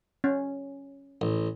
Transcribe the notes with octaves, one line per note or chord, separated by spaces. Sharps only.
C#4
A1